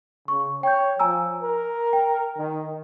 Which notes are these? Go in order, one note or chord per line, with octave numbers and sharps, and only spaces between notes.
C#3 C#6
C#5 G5 G6
F3 G#5 A#5 E6
A#4
G5
D#3